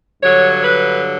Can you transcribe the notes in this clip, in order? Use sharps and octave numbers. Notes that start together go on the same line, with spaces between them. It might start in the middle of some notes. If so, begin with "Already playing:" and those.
G2 D3 F#3 C#5
B4